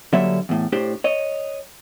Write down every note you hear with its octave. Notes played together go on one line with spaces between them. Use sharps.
D3 F#3 G3 A#3 C#5 E5
E2 A2
A2 D4 G4 C5
C#5 D#5